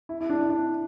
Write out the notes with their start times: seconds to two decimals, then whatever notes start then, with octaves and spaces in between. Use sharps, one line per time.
0.09 E4
0.21 E4
0.30 D4
0.50 D4